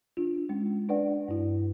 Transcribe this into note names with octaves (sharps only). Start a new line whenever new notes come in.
D4 F4
G#3 C#4
D4 B4 D5 F#5
G2 E4